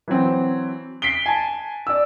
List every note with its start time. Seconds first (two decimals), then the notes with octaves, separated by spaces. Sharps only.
0.08 E3 F#3 C4
1.02 B6 C7 D7 G7
1.26 G#5 A5
1.87 D5 E6